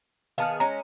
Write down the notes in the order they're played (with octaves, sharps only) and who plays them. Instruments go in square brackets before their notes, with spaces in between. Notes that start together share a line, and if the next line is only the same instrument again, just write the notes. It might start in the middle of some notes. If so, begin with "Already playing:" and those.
[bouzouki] D#3 B3 G#4 [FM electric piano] F5 A5 F6
[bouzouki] G#3 C#4 [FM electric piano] A#5